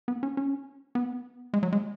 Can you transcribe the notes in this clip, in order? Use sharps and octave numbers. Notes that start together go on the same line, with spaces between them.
B3
C#4
C#4
B3
G#3
F#3
G#3